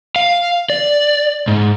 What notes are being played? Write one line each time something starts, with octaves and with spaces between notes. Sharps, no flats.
F5
D5
G#2